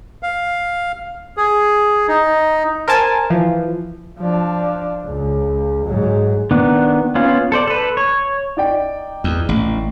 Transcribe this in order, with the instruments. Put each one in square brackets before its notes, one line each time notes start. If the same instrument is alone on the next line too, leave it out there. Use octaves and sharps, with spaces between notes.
[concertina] F5
G#4
D#4
[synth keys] A#4 C5 G#5 A5
E3 F3
[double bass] F3 D4
C#2
G#2 F#3
[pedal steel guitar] D#3 B3 D4
B3 C#4 F4
A4 C5 D5
A4 B4
C#5
[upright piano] D#4 D5 G5
[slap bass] E2
A1